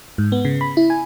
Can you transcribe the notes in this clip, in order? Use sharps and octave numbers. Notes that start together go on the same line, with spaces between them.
G#2
B3
C#3
B5
E4
G#5